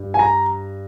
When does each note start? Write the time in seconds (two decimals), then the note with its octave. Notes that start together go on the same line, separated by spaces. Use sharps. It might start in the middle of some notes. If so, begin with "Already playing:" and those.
Already playing: G2
0.14 G#5
0.19 A#5